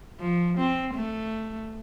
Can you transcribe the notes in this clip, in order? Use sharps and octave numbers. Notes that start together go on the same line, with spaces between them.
F3
C4
A3